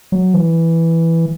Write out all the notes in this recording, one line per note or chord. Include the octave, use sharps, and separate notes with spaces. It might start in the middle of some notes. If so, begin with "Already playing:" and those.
F#3
E3